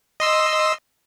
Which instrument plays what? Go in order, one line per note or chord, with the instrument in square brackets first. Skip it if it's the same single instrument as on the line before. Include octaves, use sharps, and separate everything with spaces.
[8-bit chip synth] D#5 C6 E6